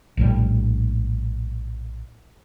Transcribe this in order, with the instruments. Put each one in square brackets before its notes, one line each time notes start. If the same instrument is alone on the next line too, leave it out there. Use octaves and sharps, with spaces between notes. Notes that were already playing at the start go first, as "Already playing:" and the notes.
[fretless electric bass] A#1 A2 G3